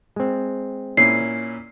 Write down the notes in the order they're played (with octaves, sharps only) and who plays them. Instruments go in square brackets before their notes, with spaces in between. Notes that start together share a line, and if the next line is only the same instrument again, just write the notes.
[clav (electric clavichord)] G#3 C4
[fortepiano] A#2 C#4 E4 [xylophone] C7